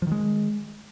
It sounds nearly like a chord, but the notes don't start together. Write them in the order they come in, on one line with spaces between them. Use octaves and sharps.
F3 D#3 G#3